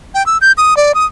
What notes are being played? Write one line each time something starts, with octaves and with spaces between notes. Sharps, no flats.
G5
E6
G6
D#6
D5
D#6